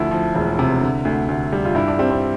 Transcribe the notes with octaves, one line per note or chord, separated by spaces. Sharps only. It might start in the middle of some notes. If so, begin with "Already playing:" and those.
Already playing: D2 F3 E4
F3
E1
C3
D3
D2
D2
G3
F4
G2 E4
D4
G3 C4
C4